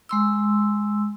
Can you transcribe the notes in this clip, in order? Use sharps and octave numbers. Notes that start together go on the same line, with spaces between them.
G#3 C6 E6